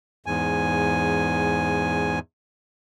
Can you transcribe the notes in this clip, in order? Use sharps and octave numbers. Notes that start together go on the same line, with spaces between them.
E2 G#2 G#5